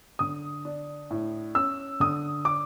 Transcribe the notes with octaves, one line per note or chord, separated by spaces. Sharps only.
D3 D#6
D4
A2
C#4 E6
D3 D#6
D4 D6